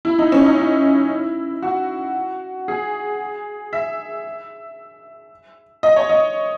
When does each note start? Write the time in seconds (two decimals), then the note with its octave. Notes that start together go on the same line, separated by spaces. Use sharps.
0.05 E4
0.19 D#4
0.32 C#4
0.45 D#4
0.58 E4
1.62 F#4
2.68 G#4
3.73 E5
5.83 D#5
5.96 C#5
6.09 D#5